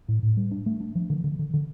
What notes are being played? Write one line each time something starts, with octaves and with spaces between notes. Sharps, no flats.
A2
A2
G3
D4
A3
D4
F3
D3
D3
D3
D3